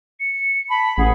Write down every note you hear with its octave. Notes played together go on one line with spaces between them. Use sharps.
C#7
A5 B5
A1 G#4 F#5